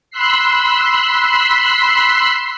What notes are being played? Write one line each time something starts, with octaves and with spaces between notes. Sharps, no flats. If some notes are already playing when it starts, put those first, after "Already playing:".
B5 C6 E6 F#6 B6 C7